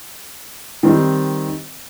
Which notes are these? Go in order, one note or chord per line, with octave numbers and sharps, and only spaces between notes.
D#3 G3 C4 D#4